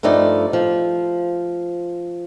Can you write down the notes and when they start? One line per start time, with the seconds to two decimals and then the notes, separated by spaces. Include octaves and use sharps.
0.03 G2 F3 A3 D#4 D5
0.53 F3